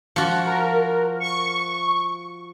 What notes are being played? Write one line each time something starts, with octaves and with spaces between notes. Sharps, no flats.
F3 F#4
A#4
C#6